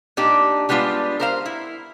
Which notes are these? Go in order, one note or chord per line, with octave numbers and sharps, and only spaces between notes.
A#2 D4 D#4 G4
G3 G#3 B3 D4 F4
A#4 C5 F5
E4